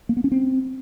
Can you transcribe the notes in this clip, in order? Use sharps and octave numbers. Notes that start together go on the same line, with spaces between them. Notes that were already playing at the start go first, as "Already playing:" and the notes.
A#3
B3
C#4
C4